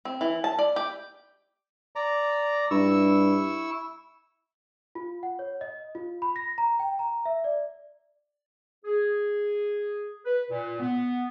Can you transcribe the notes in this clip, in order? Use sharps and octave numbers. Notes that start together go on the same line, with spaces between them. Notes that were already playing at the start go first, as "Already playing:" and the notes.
C4
E3
A5
D5
G4
D5 A#5
G2 E4 C#6 E6
F4
F#5
C#5
D#5
F4
B5
A#6
A#5
G5
A#5
E5
D5
G#4
B4
A#2
B3